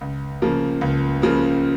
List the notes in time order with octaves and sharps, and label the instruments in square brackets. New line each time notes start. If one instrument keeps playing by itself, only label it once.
[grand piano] C#2
C#3 F3 A#3
C#2
C#3 F3 A#3